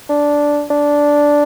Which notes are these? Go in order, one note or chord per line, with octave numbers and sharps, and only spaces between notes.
D4
D4